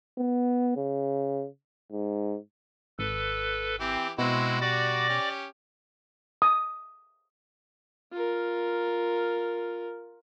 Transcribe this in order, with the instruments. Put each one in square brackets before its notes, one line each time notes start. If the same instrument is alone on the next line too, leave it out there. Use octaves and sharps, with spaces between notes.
[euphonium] B3
C#3
G#2
[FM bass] G#1 [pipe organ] A4 B4
[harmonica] E3 G4 [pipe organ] C4
[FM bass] B2 [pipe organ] G#3 [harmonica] C4 E4 F#4
[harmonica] G3 F#4 [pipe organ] D5 D6 A#6
[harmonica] C#4 G4
[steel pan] D#6
[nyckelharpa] F4 A#4